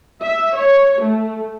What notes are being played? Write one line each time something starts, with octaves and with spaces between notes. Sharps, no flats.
E5
C#5
A3